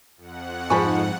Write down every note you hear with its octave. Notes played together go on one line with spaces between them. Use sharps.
F2 F#5
G#2 F3 G#5 B5 C#6